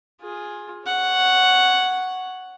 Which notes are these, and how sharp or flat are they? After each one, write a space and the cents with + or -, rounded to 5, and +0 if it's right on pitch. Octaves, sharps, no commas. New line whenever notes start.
F4 +15 G#4 +0
C#5 +0 F#5 +0